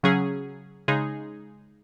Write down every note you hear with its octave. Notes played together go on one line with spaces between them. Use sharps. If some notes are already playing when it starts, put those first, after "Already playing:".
C#3 F#3 C#4 G#4
C#3 G#3 D#4 G#4